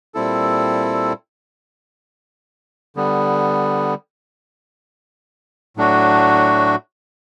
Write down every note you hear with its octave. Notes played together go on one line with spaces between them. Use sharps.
A#2 G3 C4 E4 A4
D3 G3 B3
A2 F#3 A3 D4 F#4